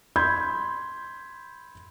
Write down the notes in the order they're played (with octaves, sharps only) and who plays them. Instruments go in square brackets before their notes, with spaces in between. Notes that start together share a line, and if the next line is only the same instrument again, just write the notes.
[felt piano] B5 C6 G6 G#6